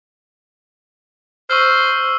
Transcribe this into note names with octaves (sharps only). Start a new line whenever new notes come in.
C5 C#6 E6 F6